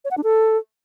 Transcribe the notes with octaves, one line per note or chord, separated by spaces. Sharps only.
C#5
F#5
D4
A4